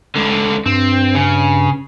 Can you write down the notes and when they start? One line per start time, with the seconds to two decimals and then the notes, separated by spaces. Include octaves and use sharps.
0.15 C#2 D3
0.66 G2 C4
1.15 C#3